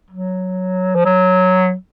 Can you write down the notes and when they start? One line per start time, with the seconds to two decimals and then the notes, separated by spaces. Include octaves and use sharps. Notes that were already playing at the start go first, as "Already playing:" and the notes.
0.10 F#3
0.95 F3
1.05 F#3